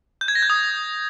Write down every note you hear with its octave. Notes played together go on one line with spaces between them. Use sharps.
G6
G#6
A#6
G6
D#6